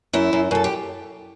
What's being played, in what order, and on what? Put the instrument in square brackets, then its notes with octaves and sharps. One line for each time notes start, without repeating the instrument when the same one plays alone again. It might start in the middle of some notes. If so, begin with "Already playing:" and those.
[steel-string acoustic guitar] F#2 E4
F#2
F#2 A4
G4